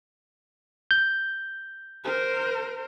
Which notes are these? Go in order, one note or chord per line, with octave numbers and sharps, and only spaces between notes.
G6
A#4 C5